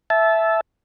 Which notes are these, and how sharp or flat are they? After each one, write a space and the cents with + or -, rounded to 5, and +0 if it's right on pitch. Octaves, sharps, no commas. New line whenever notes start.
E5 +0 A5 -20